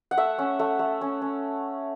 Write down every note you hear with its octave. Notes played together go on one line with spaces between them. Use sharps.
F#5
A3 E5
C#4
A3
A3
C#4
C#4